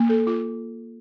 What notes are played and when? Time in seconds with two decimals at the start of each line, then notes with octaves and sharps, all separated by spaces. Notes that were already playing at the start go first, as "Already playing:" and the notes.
Already playing: A#3
0.09 A4
0.27 F4